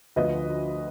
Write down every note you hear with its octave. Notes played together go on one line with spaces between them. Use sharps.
D2 D3 F3 B4 D#5